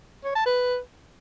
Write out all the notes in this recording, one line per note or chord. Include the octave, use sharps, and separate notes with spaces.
C#5
A5
B4